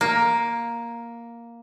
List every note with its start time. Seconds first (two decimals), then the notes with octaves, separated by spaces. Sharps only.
0.01 A#3